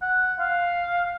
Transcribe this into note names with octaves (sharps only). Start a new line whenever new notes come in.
F#5
F5